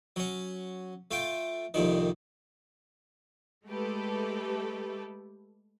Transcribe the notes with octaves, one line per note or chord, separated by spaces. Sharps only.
F#3 C#4
A3 F4 G5
C2 F2 A#2 D#3
G#3 A3 G4 A4 B4